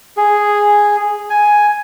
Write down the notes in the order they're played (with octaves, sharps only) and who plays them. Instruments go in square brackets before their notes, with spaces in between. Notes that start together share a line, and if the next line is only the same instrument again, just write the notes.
[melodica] G#4
G#5